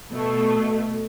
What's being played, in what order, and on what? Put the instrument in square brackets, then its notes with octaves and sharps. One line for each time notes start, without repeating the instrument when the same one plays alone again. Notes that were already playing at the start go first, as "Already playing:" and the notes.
[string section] B2 A3